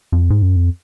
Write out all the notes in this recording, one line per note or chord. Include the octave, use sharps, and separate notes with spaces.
F2
G#2
F#2
F2